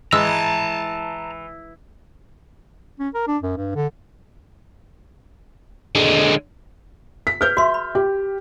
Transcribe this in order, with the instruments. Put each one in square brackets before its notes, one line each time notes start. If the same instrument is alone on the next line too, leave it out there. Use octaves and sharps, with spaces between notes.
[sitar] E3 [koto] G#3 [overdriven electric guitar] A5 A#5 [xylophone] E6
[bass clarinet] C#4
A#4
D4
F#2
G2
D3
[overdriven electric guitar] D3 G#3
[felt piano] B6
[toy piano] G#4 B4 [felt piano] F6 G6
[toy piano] F#4 C6 [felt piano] E5
[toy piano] B5
[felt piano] G4